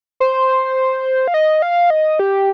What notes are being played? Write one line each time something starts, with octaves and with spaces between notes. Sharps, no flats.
C5
F5
D#5
F5
D#5
G4